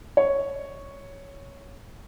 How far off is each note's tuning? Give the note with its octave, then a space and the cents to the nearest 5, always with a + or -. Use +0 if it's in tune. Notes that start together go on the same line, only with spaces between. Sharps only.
C#5 +0